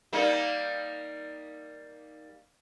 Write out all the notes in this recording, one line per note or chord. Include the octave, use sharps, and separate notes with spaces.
G3 A#3 D#4